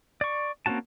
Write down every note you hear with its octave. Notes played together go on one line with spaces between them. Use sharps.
D5 C#6
A#3 C4 C#4 F#4 A5